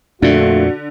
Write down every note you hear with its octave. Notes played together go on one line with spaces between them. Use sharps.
F2 A#2 D3 A3 F4 F#4